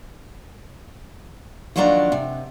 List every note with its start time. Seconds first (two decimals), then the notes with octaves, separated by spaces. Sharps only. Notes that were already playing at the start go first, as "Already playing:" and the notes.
1.76 D#2 F3 F#3 A#3 D4 A#5
2.12 C3